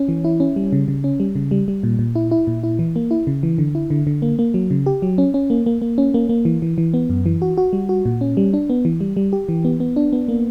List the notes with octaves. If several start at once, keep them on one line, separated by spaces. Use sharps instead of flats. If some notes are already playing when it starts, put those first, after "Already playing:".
Already playing: C#4
E3
E4
C#4
G3
C#3
C#3
C#4
G3
C#3
G3
G3
A#2
A#2
E4
E4
A#2
E4
E3
A#3
E4
C#3
E3
D3
E4
D3
D3
A#3
A#3
F#3
C#3
G4
F#3
C#4
C#4
A#3
A#3
A#3
C#4
A#3
A#3
E3
E3
E3
B3
F#2
E3
F#4
F#4
G3
F#4
A#2
C#4
G3
D4
B3
E3
G3
G3
G4
E3
B3
B3
D4
B3
A#3